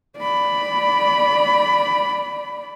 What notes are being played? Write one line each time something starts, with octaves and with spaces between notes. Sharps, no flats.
D5 B5